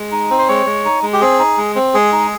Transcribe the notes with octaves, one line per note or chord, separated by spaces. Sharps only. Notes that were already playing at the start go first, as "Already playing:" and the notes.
Already playing: G#3
D#4
C4
C5
G#3 C#5
G#3
D#4
G#3
G4
C4 G#4
D#4
G#3
C4
G#3 G#4
D#4